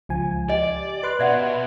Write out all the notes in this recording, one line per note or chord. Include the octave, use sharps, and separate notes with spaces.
C#2 F3 G#5
G4 D5 D#5
B4 C6 F#6
B2 D5 E5 F#5